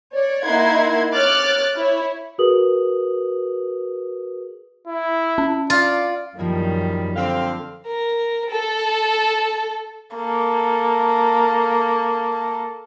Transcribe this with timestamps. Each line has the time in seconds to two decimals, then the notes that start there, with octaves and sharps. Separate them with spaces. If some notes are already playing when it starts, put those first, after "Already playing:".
0.14 C#5 D5
0.44 A#3 D#4 E4 F#5 C6 G#6
1.14 C#5 D6 F6 F#6 A6
1.76 E4 C#5
2.38 F#4 G#4 A#4 B4 D#6 F#7
4.87 E4
5.38 C#4
5.70 F4 D5
6.39 F#2 D#3 F3 G3 A#3 E4
7.16 D3 C4 F5 G5
7.87 A#4
8.50 A4
10.15 A#3 A4